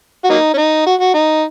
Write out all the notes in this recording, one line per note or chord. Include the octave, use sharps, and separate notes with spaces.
F#4
F#3 A#3 D#4
C#4
D#4
F#4
F#4
D#4